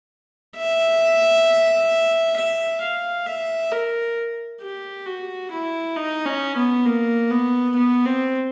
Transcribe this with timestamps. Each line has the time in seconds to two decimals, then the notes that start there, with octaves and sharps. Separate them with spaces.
0.56 E5
2.36 E5
2.81 F5
3.26 E5
3.71 A#4
4.61 G4
5.06 F#4
5.51 E4
5.96 D#4
6.25 C#4
6.56 B3
6.86 A#3
7.31 B3
7.76 B3
8.05 C4